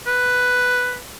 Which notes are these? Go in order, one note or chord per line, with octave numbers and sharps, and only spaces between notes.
B4